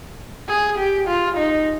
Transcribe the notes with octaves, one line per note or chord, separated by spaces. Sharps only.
G#4
G4
F4
D#4